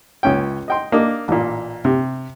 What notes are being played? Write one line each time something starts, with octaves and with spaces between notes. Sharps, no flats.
C#2 C#4 G5
D#5 G5 C6
A#3 D4 D#5
A1 A#2
C3